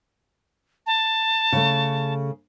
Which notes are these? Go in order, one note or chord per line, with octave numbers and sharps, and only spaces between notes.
A5
C#3 A3